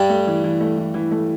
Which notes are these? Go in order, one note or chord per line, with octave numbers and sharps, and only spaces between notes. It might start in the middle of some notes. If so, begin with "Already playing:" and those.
Already playing: G2 G3
A3
E3
E3
A3
E3
E3
A3